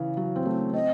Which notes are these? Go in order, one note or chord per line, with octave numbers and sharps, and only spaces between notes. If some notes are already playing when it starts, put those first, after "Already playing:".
Already playing: C#3 E3
F#3
C4
A3
C4 D#5